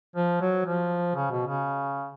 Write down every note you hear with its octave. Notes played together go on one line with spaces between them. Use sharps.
F3
F#3
F3
C#3
B2
C#3